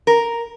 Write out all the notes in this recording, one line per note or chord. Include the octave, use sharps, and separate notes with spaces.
A#4